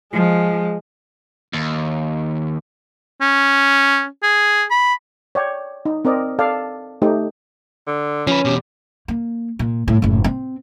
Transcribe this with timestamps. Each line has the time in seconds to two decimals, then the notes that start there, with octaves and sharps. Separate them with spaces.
0.13 F3 G#3
1.53 D#2
3.21 C#4
4.23 G#4
4.70 B5
5.35 C#5 D5 G5
5.85 D#4
6.05 C4 A#4 D5 D#5
6.39 A4 D5 F5
7.02 A3 D#4 G4
7.87 D3
8.27 F3 C#4 B4
8.45 E2 B2 G4
9.08 A#3
9.59 A#2
9.88 A2
10.02 F#1 A2
10.24 C4